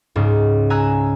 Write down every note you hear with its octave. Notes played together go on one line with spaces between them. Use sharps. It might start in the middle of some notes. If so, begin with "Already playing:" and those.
C#2 G#2
G#5 A#5 E6 F#6